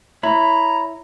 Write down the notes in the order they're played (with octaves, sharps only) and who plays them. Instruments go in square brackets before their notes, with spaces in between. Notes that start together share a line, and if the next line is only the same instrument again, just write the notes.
[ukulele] E4 [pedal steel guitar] C#5 B5 [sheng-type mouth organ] A#5